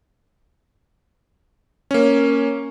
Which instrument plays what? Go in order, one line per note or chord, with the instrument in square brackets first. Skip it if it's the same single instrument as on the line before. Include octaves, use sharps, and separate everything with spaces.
[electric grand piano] A#3 C#4